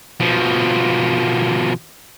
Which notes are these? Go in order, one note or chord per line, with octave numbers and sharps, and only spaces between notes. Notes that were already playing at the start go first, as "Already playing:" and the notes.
B2 F3